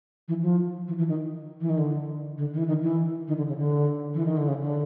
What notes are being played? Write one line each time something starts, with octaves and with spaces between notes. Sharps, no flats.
E3
F3
E3
E3
D#3
E3
D#3
D3
D3
D#3
E3
D#3
E3
D#3
D3
C#3
D3
E3
D#3
D3
C#3
D3